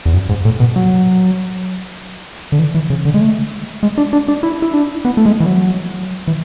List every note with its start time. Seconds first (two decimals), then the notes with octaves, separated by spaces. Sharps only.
0.06 E2
0.14 F#2
0.29 G#2
0.45 A2
0.60 B2
0.76 F#3
2.52 D3
2.59 E3
2.75 E3
2.90 C#3
3.05 D3
3.14 G#3
3.21 A3
3.83 G#3
3.98 D4
4.13 D4
4.28 D4
4.43 E4
4.62 E4
4.74 D4
5.05 B3
5.17 A3
5.26 G#3
5.40 E3
5.46 F#3
6.27 E3